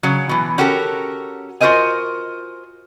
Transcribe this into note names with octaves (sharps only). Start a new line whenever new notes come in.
C#3 F#3
B2 E3
C#4 F#4 G4 A4 A#4
F4 F#4 A#4 C5 D#5 G#5